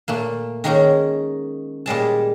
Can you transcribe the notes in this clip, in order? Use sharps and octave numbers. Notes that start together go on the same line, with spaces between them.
A#2 A3 A#3
D#3 G#3 A#3 C#4 A#5
A#2 G3 G#3 A5